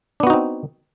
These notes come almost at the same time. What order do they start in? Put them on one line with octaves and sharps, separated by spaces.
D4 B3 F#4 D#4 C4